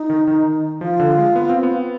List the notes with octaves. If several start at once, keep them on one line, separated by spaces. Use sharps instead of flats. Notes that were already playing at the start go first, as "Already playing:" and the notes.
Already playing: D#4
D#3
D#3
F3 F4
D3
G#3
B3
C4
B3